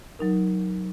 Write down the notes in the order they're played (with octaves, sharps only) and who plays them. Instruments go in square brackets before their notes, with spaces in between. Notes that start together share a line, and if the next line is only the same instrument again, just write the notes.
[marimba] F#3 D#4 A#4